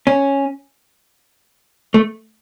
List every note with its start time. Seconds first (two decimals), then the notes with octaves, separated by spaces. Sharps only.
0.07 C#4
1.94 A3